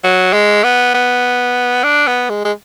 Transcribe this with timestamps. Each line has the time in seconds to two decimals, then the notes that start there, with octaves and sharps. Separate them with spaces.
0.04 F#3
0.33 G#3
0.63 B3
0.94 B3
1.84 D4
2.07 B3
2.29 G#3
2.45 G#3